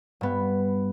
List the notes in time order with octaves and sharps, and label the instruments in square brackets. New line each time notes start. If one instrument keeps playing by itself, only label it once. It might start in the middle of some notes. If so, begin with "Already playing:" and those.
[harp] G2 B3